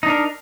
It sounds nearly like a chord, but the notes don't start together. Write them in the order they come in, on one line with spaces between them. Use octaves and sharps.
D#4 D4 A#4